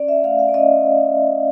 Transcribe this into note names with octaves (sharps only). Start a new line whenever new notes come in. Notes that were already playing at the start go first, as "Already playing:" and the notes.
Already playing: C#4 D5
E5
A3 F5
F5
D5
C#4 D#5